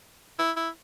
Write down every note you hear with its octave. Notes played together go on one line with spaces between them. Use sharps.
E4
E4